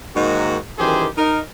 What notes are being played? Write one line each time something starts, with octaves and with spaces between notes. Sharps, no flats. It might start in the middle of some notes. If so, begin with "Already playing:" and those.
G#2 D#3 A#3 D#4 F#4
F#2 D#3 E3 G4 G#4 C5
D#4 A#4